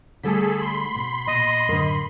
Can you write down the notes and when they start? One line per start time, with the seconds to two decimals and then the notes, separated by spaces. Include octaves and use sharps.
0.23 D3 G3 A3 G#4 A4 B6
0.59 B5 C6
0.95 B2
1.28 A#2 D#5
1.69 F#2 A2 D3 A#4